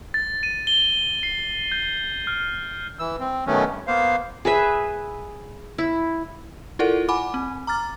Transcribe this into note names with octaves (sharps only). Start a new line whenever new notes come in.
A6
D#7
G7
C7
G6
F6
E3 E6
C4
B2 D#3 F#3 A3 B3 C#4
G2
A#3 B3 C5 F5
G#4 B4 E5
E4
E4 F4 A4 A#4 D5 F#5
F#5 G#5 B5 D6
C4
A#5 D6 F6 A6